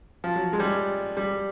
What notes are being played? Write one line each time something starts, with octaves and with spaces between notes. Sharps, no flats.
F3
F#3
G#3
G3
G3